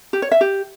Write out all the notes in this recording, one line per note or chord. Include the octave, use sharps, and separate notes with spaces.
G4
C#5
E5
G4